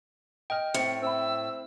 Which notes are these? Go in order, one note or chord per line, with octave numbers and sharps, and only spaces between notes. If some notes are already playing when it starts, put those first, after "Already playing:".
D#5 G5 F6
A2 C4 E5 C#7
C4 E5 B5 E6